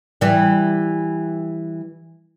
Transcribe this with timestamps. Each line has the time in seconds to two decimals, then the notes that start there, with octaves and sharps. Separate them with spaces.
0.21 E3 G3